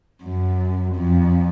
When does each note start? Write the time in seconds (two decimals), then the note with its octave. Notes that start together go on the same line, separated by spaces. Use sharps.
0.24 F#2
0.96 F2